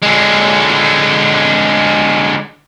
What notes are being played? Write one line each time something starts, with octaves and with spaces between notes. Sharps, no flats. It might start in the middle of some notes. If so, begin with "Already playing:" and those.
D3 G#3